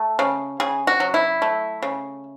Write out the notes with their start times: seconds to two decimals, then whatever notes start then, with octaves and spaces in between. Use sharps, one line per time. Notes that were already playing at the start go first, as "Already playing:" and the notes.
Already playing: A3
0.19 C#3
0.60 C#3 G#4
0.87 F#4
1.00 F#3
1.14 E4
1.42 A3
1.83 C#3